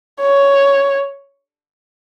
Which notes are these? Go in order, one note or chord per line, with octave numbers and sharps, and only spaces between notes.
C#5